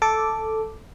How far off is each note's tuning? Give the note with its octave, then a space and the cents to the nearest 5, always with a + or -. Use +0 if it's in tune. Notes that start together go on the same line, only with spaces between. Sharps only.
A4 +0 D6 +0